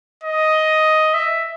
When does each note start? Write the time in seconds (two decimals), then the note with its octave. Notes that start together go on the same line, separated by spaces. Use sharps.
0.24 D#5
1.14 E5